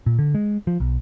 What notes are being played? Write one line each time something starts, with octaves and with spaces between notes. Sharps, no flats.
A#2
D3
G#3
F3
B1